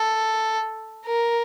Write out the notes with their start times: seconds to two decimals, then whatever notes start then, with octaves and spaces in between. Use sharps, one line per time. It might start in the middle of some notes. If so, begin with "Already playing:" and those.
Already playing: A4
1.06 A#4